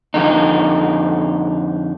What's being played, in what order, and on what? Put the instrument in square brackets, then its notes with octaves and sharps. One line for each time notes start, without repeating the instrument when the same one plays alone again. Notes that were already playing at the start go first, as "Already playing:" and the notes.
[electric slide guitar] F2 D3 D#4